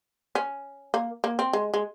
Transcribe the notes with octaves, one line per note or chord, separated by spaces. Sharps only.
C#4
A#3
A#3
C4
G#3
G#3